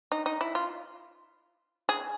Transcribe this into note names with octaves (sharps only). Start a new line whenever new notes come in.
D#4
D#4
E4
F4
G#4